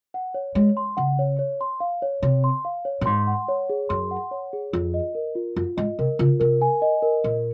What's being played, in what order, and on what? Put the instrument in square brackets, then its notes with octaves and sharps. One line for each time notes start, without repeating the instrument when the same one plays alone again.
[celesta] F#5
C#5
[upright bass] G#3 [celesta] C#5
[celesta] C6
[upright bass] C#3 [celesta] F#5
[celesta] C#5
C#5
C6
F5
C#5
[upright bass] C3 [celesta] C#5
[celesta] C6
F5
C#5
[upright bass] A#2
[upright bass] G#2 [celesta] C6
[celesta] F#5
C#5
G#4
[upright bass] F#2 [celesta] C6
[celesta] F#5
C#5
G#4
[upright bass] F2 [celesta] F4
[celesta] D#5
A#4
F4
[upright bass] F#2 [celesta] F4
[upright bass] G#2 [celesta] D#5
[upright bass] C3 [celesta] A#4
[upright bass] C#3 [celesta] F4
[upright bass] C3 [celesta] A#4
[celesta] G#5
D#5
A#4
[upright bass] A#2 [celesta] A#4